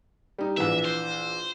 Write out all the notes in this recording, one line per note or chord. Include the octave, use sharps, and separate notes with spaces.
G3 D#4
A#1 E3 E5
C5